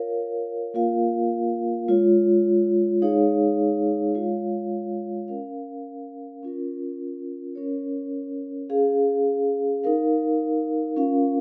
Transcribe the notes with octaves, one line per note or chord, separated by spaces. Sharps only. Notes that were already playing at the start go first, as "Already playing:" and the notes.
Already playing: F4 A#4 C#5 F5
A#3 F4 A#4 F5
G#3 F4 C#5
G#3 D#4 G#4 C#5 F5
G#3 F4 C#5 F5
C#4 A#4 F5
C#4 F4 A#4
C#4 A#4 C#5
C#4 G#4 F5
D#4 A#4 F5
C#4 F4 A#4 F5